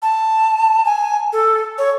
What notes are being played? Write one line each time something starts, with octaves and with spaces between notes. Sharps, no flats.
A5
G#5
A4
C#5